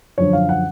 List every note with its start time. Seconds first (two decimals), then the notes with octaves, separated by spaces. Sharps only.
0.18 F#2 D3 F3 C#5
0.33 F5
0.49 F#5